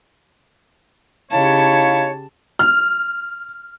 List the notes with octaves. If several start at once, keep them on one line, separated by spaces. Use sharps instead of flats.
C#3 D#4 E4 G4 C#5 F5 A5
F6